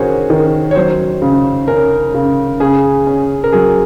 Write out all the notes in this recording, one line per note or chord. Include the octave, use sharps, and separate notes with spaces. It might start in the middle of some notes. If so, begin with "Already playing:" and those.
Already playing: D#3 C#4 F#4 G#4 A#4 C5 C#5
D#3
C#5
F#3 C5
C#3
C#4 A#4
C#3
C#3 G#4
C#4
A#4
F#3 G#4